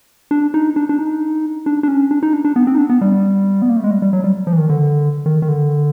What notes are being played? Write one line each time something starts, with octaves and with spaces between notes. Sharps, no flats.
D4
D#4
D4
D4
D#4
D4
D4
C#4
D4
D#4
D4
D4
B3
C4
D#4
D4
B3
G3
B3
A#3
A3
G#3
G3
G3
F#3
G3
F3
E3
D#3
D3
D#3
D#3
D3